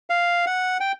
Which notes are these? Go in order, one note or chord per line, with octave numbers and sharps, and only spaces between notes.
F5
F#5
G5